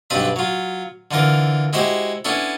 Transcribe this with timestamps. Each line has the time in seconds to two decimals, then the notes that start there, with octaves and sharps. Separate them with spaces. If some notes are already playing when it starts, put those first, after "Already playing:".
0.10 B1 G2 C4 D4 B4 B5
0.36 F#3 F4
1.11 D3 E3 F4 A#4
1.73 G#3 E4 F#4 G4 C5 E5
2.25 B3 C#4 D4 E4 A4